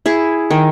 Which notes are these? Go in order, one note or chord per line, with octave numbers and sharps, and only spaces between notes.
E4 G#4
D#3